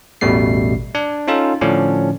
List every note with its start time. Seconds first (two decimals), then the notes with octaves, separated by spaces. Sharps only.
0.21 A1 E2 B2 G3 A3 C7
0.95 D4
1.28 C#4 D#4 F4 A4
1.61 A2 D3 F3 C#4 D4